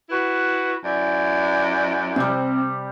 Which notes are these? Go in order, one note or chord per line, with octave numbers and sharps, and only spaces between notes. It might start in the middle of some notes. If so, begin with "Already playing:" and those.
E4 F#4 B4
F#2 E4 D5
C3 G3 C4